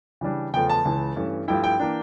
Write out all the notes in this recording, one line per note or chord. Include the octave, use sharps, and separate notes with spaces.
C#3 E3 G3 D4
E2 C#3 F3 A3 G5
A5
C#2 C#3 E3
G2 E3 A3 C#4
G2 F3 A3 E4 G5
G5
E3 A#3 D4